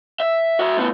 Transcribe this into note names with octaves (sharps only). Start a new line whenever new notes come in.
E5
F#4 E5
A2 B3